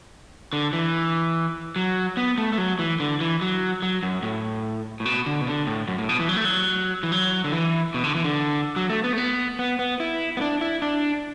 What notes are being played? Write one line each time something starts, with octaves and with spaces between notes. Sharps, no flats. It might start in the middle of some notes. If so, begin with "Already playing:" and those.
D3
E3
F#3
B3
A3
A3
F#3
E3
D3
E3
F#3
F#3
F#2
A2
A2
B2
D3
B2
D3
A2
F#2
A2
B2
E3
F#3
A3
F#3
E3
F#3
D3
E3
B2
D3
E3
D3
F#3
A3
B3
A3
B3
B3
B3
E4
B3
D4
E4
D4